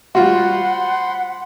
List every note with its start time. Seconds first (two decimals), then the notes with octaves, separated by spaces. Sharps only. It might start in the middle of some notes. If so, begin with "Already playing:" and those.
0.15 G3 F4 F#4 C5 F#5 B5 C6